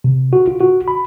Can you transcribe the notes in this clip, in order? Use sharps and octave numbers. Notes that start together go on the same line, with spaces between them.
C3
F#4
F4
F#4
B5